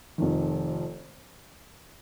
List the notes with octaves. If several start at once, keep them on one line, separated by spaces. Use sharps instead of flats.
F1 F2 D#3